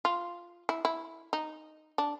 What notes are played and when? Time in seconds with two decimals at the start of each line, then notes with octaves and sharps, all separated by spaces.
0.05 F4
0.69 E4
0.85 E4
1.33 D#4
1.98 D4